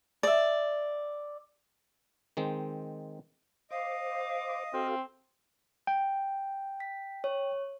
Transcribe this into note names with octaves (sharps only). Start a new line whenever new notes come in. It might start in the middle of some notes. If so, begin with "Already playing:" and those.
D5 E5
D#3 G#3 C4
C5 D#5 F5 D6
C4 F#4 A4 F5
G5
B6
C#5